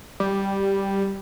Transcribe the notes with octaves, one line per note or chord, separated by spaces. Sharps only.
G3